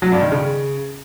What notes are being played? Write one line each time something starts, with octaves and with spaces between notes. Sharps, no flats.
F#3
G2
D#3
C#3